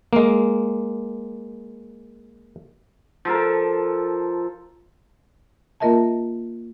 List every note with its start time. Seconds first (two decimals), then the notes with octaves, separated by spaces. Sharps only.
0.13 G#3 A#3
3.25 F3 A4 A#4
5.80 A#3 F4 A#4 D#5 E5 A5